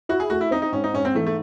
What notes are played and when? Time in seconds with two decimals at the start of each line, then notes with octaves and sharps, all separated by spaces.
0.09 E4 F#4
0.20 G#4
0.30 A3 F#4
0.41 E4
0.51 C4 D#4
0.62 D#4
0.72 G#2 C#4
0.84 D#4
0.94 G#2 C#4
1.05 C4
1.15 E3 A3
1.27 A3